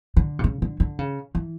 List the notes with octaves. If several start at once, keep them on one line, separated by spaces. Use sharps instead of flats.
D3
C3
C#3
D3
D3
C#3
E3